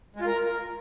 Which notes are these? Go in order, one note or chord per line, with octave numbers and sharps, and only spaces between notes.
G#3
F4
A#4